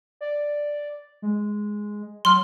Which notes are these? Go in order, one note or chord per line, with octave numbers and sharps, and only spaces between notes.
D5
G#3
F#3 C6 F6